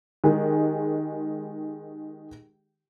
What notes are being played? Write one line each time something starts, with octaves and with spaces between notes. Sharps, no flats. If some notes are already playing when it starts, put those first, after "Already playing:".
D#3 G#3 G4 G#4